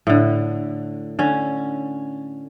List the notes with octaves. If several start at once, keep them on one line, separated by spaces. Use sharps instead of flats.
A2 D3
D3 C#4